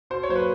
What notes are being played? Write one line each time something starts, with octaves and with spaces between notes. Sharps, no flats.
B2 C5
C#5
F#3 A#3 C5
B4